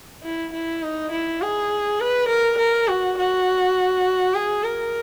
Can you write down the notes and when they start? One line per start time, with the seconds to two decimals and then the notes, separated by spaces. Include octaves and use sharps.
0.23 E4
0.53 E4
0.83 D#4
1.12 E4
1.41 G#4
2.00 B4
2.29 A#4
2.58 A#4
2.88 F#4
3.17 F#4
4.34 G#4
4.64 A#4